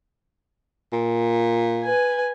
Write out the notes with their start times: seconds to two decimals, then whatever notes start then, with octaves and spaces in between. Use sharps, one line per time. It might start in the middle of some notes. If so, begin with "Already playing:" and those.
0.93 A#2
1.82 B4 G#5